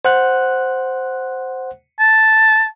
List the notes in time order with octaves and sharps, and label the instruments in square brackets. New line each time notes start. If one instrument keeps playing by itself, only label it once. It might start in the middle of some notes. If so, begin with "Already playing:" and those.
[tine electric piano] C5 F#5 F#6
[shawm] A5